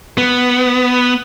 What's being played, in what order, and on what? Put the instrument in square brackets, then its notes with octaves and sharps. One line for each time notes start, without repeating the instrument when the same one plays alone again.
[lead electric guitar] B3